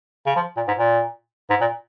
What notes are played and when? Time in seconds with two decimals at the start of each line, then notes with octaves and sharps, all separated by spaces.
0.26 C#3
0.36 F3
0.57 A#2
0.68 G#2
0.78 A#2
1.50 G#2
1.61 A#2